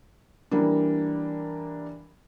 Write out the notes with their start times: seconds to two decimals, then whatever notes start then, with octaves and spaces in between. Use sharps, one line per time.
0.51 E3 G3 A#3 D4